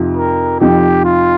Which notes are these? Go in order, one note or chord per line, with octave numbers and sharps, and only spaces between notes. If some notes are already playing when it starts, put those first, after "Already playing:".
Already playing: F2 C3 F3 D#4
A#4
F2 C3 F3 D#4 G4
F4